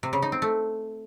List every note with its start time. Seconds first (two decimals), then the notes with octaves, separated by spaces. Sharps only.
0.03 C3
0.13 C#3
0.22 D#4
0.32 C4
0.42 A3